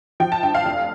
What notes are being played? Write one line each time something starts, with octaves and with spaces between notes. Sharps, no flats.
F3 G5
A5
G2 G5
F5
F1